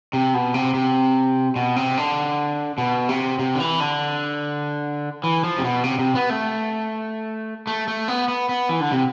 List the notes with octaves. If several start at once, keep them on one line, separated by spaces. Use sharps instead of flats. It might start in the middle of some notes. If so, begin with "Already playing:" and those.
C3
B2
C3
C3
B2
C3
D3
B2
C3
C3
D3
E3
D3
E3
F3
C3
B2
C3
C3
B3
A3
A3
A3
B3
B3
B3
E3
D3
C3